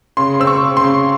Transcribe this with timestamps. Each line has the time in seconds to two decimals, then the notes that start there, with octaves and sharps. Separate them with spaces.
0.17 C#3 C6
0.40 C4 E6
0.47 C#6
0.62 C#3
0.77 C6
0.84 C#3